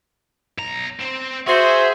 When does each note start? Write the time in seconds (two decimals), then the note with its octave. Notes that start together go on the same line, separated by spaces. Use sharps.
0.58 B1 A#5
1.00 C4 C5
1.47 F#4 G#4 C5 E5 C6